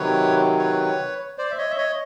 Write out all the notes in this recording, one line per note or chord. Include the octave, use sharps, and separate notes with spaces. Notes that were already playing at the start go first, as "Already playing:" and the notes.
Already playing: C3 D#3 F#3 B4 C#5
B4 C#5
C5 D5
E5
C#5 D#5
E5
C#5 D#5